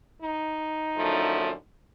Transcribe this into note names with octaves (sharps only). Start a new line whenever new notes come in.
D#4
F#2 D3 F3 A3